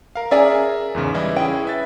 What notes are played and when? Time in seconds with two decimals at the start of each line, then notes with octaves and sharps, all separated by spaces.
0.15 A#4 F5
0.31 C#4 G#4 A#4 D5 E5 G#5
0.95 E2 G#2 C#3
1.15 E3 G3 E4 D#5
1.36 C#4 E4 G#4 G5
1.65 B4 E5 A6